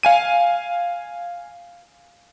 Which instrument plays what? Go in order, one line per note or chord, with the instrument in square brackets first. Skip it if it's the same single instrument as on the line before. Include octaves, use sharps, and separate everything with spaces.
[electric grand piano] F5 G#5 D#7